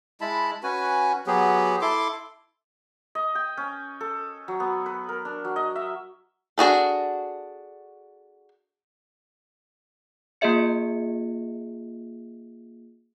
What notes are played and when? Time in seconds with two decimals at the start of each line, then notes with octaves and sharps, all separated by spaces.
0.21 G#3 E4 A5 B5
0.63 C#4 F#4 B4 G#5
1.27 F#3 B3 G4 G#4
1.81 E4 A4 C6 D6
3.15 D#5
3.35 G5
3.57 C#4
4.01 A4
4.48 F#3
4.60 B3
4.86 B4
5.09 A#4
5.25 D4
5.45 F#3
5.56 D#5
5.75 E5
6.58 D4 F#4 G#4 A4
10.41 A#3 F4 G#4 D#5 E5 C#7